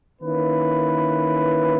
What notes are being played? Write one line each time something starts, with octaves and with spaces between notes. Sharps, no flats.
D#3 A#3 C#4 E4 B4